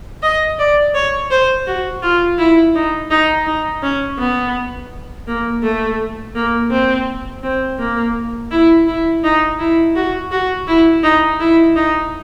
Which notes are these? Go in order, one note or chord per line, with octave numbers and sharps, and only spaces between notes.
D#5
D5
C#5
C5
F#4
F4
E4
D#4
D#4
D#4
C#4
B3
A#3
A3
A#3
C4
C4
A#3
E4
E4
D#4
E4
F#4
F#4
E4
D#4
E4
D#4